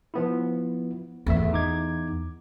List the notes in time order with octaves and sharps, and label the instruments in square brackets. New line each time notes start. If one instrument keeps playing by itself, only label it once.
[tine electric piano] F3 B3 E4
[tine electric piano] G#1 A3 E5 [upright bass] E2
[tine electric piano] D#4 D6 G#6